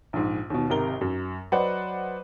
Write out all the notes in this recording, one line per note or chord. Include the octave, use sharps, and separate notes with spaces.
A#1 G#2
D#2 B2
G#1 C3 G4 A#4 A#5 G7
F#2
F#3 B4 C5 D5 D#5 F#5